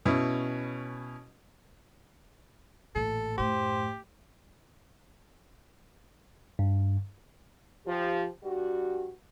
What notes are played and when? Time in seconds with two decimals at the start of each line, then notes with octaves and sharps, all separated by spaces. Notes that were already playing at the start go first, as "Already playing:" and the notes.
0.06 B2 C#4 E4
2.95 A1 A#2 A4
3.38 F#2 A2 G4 C5
6.59 G2
7.86 F3 G4
8.44 G2 G3 F#4